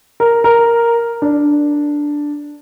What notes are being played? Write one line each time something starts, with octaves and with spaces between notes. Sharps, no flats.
A#4
A#4
D4